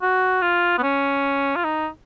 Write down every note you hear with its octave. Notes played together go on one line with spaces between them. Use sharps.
F#4
F4
B3
C#4
F4
D#4